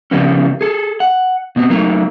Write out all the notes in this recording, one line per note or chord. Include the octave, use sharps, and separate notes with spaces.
C#3 F3 G3 A#3 B3 C#4
G#4 A4
F#5
B2 B3 C4
F#3 A3 A#3 D#4 A#4